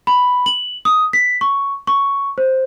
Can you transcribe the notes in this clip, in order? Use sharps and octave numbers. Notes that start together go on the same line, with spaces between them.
B5
F#7
D#6
B6
C#6
C#6
C5